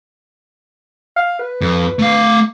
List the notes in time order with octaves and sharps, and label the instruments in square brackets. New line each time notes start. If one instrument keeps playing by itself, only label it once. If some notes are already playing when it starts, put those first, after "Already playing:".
[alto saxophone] F5
B4
[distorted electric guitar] F2
A3 F5